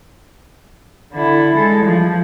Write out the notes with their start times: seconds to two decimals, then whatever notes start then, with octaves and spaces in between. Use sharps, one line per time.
1.12 D3 E4
1.55 G#3 A4
1.85 F3